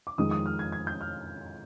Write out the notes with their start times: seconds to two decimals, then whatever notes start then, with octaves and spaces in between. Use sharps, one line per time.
0.07 D6
0.18 F2 D#3 G#3 D#6
0.31 D#6
0.46 F6
0.59 G#6
0.72 G#6
0.87 G6
1.01 F6